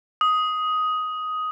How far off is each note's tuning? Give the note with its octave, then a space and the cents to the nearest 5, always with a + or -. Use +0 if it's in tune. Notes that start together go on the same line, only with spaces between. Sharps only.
D#6 +10